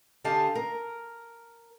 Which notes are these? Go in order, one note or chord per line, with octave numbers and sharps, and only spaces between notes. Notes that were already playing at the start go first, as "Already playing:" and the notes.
D3 G4 G#4 F5 A5
A#4